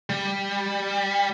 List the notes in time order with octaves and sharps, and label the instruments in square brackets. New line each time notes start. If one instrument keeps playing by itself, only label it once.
[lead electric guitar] G3